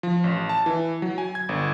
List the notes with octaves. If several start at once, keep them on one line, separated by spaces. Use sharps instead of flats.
F3
A1
A5
E3
F#3
G#5
G#6
G1